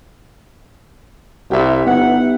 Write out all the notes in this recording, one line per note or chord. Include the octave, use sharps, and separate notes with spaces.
C2 G4 E5
G1 B3 D#4 F#5